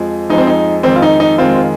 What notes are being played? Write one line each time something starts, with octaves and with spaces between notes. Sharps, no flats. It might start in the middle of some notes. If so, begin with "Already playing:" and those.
Already playing: F2 F3 G#3
F2 F3 G#3 D#4
C4
D#4
F2 D#3 G#3 C4
F4
D#4
D#4
F2 D#3 G#3 C4 F4
F4